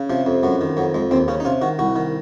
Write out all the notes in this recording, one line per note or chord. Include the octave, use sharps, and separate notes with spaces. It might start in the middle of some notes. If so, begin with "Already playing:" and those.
Already playing: C#3
C3 F3
F2
F#2 F#3
D#3
F2 F#3
F2 G#3
D#2 C4
C#3 C#4
D#4
C3 F4
D#3 F#4
C2 F#4
D#3